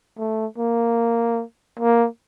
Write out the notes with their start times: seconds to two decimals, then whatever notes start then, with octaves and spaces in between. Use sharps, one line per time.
0.18 A3
0.58 A#3
1.79 A#3